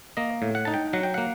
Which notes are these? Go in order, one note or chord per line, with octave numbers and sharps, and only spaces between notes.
A#3 D#5
A2
F#5
D#4 A5
G5
F#3 F#5
G5
A#3 F#5